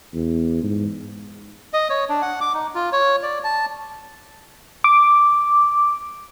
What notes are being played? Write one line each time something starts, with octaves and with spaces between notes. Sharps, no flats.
E2
G#2
D#5
C#5
D4
F#5
D6
D#4
F4
C#5
D5
A5
D6